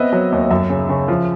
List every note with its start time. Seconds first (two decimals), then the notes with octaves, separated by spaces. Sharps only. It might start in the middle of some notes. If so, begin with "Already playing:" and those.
Already playing: B3 C4 D#5 E5
0.12 F#3
0.32 D#2
0.51 F#2 E5
0.70 C#3
0.89 C#3
1.08 F3